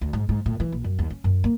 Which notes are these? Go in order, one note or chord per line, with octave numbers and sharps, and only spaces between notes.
D2
G#2
G#2
A2
E3
A#1
F#2
D#2
C#4
F#2
A#3